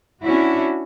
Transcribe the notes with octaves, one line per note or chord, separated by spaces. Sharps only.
C#4 D4 E4 F#4